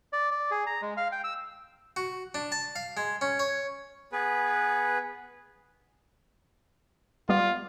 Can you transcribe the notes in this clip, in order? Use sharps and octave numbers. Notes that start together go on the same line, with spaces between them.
D5
D5
G#4
A#5
G#3
F5
G5
E6
F#4
D4
A5
F5
G#3
C#4
C#5
B3 G#4 B4
G3 B3 F4 D5